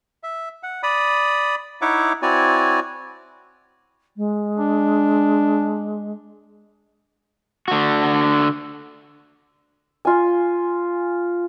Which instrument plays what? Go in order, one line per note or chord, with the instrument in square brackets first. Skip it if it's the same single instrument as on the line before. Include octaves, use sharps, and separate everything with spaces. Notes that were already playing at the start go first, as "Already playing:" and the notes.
[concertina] E5
F#5
D5 B5 D#6
D#4 E4 C#5 E5 F#5 D6
C4 E4 F#4 C#5 D5 G#5
[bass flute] G#3
[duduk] D4
[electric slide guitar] D3 F#4
[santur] F4 G#5